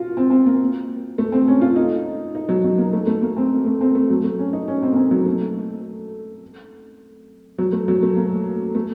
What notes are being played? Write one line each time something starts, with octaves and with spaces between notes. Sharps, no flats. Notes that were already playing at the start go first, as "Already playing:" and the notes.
Already playing: F4 F#4
C4
C4
A#3
A3
C4
C#4
F4
D#4
D#4
F#3
F#3
A#3
A3
A3
A#3
C4
A3
C4
A3
F#3
A3
C#4
D#4
C#4
C4
A#3
C4
F#3
A3
F#3
A3
F#3
A3
A#3
A3